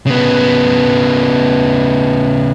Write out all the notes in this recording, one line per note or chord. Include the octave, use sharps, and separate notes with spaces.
C#3 B3